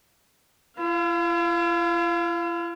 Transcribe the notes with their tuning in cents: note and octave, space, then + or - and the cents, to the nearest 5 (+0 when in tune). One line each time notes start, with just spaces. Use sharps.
E4 +45 F5 +0